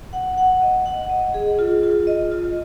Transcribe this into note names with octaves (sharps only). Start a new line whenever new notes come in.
F#5
F#5
D#5
F#5
D#5
G#4
F4
F4
D#5
F4